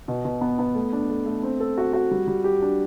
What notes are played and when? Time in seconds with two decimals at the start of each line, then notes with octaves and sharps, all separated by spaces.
0.08 B2
0.25 B2
0.41 B3
0.59 B3
0.75 A3
0.93 D4
1.09 A3
1.26 A3
1.43 C4
1.60 A4
1.78 F#4
1.93 F#4
2.11 G3
2.27 G3
2.44 G4
2.62 D4